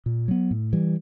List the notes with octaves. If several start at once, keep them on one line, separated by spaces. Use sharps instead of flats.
A#2
F#3 B3
A2
E3 G3